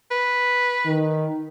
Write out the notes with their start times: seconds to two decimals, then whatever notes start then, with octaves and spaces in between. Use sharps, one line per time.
0.11 B4
0.86 D#3